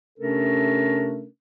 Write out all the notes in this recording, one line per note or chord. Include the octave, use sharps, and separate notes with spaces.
C3 A3 C#4 D4 A4 A#4